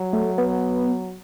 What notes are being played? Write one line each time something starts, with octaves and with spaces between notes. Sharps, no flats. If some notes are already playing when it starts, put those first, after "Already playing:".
Already playing: F#3
A3
B3